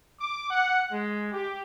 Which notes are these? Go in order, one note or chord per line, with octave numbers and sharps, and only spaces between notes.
D6
F#5
G#3
G4